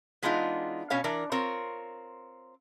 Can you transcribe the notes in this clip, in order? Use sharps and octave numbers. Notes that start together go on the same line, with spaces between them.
E3 G#3 B3 D4 D#4 F4
B2 C#4 C#5 F5
E3 D4 A#4 D5
C4 F4 A#4 C#5